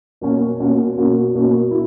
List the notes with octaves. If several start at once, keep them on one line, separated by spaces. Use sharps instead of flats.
B2 A#3 C#4 F#4
B2 A#3 C#4 F#4
B2 A#3 C#4 F#4
B2 A#3 C#4 F#4
E4